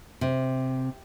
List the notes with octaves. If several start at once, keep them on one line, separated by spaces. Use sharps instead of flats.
C3